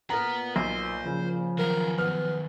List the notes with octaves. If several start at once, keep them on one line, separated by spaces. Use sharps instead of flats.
A#2 A#4 B4 F#5 A#5
B1 C5
C#3 F3
D#3 F#3 A#4
B3 F6